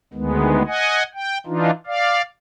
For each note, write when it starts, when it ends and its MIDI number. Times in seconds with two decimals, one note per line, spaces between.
0.14 0.62 38
0.14 0.62 51
0.14 0.62 56
0.14 0.62 59
0.67 1.03 75
0.67 1.03 78
0.67 1.03 80
1.14 1.38 79
1.47 1.71 52
1.47 1.71 62
1.47 1.71 63
1.47 1.71 65
1.87 2.22 74
1.87 2.22 77